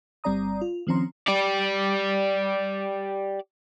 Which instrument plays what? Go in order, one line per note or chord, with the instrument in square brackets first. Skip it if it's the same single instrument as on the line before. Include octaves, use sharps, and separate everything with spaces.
[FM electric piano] G1 G3 C4 D5 A#5 D#6
F4
D#3 F3 C4 C#4 A#5 C6
[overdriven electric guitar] G4 D5